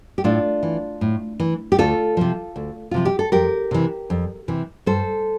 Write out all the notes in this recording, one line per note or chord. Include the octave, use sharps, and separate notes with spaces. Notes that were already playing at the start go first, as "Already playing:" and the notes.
G4
A2 D4 F4
E3
A2
E3
G4
D2 F4 A4
C3 F3
D2
C3 F3 F4
G4
A4
F2 G4 A#4
C3 E3
F2
C3 E3
G2 A4 C5